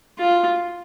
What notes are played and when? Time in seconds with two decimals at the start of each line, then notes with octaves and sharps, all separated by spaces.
0.19 F4